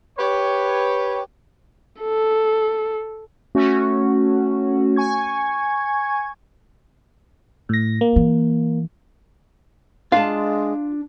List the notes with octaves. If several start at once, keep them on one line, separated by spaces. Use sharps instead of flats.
G4 B4 C#5
A4
A3 C#4 F#4
G#5 C#6 G#6
A2 A#6
A#3
E3
G#3 D4 F4 F5 A5